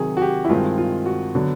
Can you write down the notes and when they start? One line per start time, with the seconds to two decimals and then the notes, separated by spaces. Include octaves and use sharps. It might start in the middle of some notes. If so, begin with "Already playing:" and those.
Already playing: C3 D#3 F#3 G#4
0.17 F#4
0.22 G4
0.45 E4
0.49 G2 D#3 G#3 C4 F4
0.78 F4
1.06 F#4
1.35 D3 F#3 B3